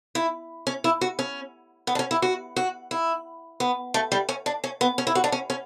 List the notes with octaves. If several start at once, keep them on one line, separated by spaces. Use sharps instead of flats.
E4
C#4
E4
F#4
C#4
B3
D4
C#4
E4
F#4
F#4
E4
B3
A3
G3
C#4
D4
C#4
B3
C#4
E4
F#4
D4
C#4
C#4